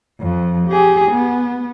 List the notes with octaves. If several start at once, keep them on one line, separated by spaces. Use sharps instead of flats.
F2 F3
G4 G#4
B3